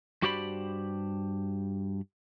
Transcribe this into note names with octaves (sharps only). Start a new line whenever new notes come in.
G2 F#4 G4 C5 D5 B5